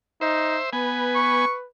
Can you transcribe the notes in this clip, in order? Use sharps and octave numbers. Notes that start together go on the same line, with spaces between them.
D#4 C5 E5
B3 B4 G#5
C#6